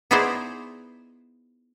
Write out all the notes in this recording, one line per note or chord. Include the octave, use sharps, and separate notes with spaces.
B3 D#4 E4 G#4 C5 D5